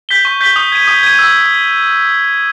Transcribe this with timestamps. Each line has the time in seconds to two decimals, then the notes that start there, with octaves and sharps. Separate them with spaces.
0.09 G6 B6 G7
0.25 C#6
0.41 G6 B6 G7
0.56 D#6
0.72 G#6 D#7
0.87 D#6
1.03 G#6 D#7
1.19 E6